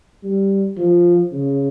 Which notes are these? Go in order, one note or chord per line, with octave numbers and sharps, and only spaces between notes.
G3
F3
C#3